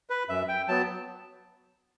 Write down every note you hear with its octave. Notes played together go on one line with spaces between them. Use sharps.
B4
F#2 E5
G5
F#3 B3 A5